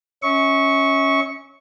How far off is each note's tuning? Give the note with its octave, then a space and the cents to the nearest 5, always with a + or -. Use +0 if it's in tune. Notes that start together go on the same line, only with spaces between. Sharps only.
C#4 +0 E5 -40 C#6 +0